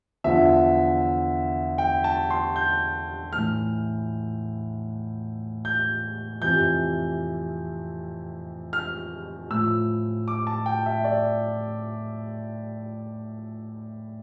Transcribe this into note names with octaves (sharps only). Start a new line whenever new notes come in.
E2 D3 F3 E5
G5
A5
C6
G6
A2 E3 F6
G6
F2 C3 E3 G6
F6
A2 F3 E6
D6
A5
G5
E5
D5